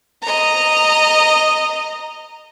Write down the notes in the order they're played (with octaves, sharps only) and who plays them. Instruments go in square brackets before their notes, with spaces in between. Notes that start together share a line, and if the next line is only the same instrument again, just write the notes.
[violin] D#5 A#5